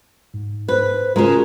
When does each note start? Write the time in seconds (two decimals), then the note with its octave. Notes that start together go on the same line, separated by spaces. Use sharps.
0.34 G#2
0.68 B4 C5
1.16 C#3 G#3 F4 F#4 A#4 A#5